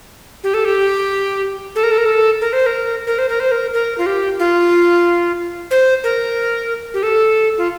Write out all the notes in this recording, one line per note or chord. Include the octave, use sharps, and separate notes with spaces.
G4
A4
G4
A4
A#4
A4
A#4
A4
A#4
C5
A#4
A#4
C5
A#4
C5
A#4
A#4
F4
G4
F4
C5
A#4
G4
A4
F4